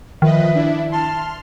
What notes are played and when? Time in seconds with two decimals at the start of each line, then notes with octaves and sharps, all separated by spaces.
0.22 D#3 F3 B4 D#5 E5
0.55 D4 E4
0.92 A5 C6 F6